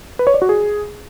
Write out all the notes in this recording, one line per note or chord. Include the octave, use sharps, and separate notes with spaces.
B4
C#5
D5
F#4
G#4